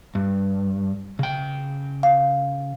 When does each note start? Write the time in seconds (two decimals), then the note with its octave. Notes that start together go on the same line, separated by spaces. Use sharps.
0.15 G2
1.19 C#3 G5
2.03 F5